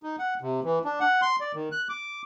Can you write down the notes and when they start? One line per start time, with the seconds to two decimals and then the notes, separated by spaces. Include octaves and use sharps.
0.03 D#4
0.19 F#5
0.41 C3
0.64 E3
0.84 D4
1.00 F#5
1.22 C6
1.40 D5
1.54 D#3
1.72 F#6
1.89 D6